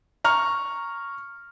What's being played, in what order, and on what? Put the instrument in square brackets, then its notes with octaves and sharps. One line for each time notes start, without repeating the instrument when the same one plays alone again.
[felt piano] A#5 C#6 F6